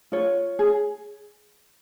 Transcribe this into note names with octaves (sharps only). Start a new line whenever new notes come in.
F4 C#5
G#4